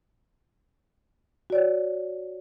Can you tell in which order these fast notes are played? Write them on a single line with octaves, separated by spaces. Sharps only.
F#4 D5 C#5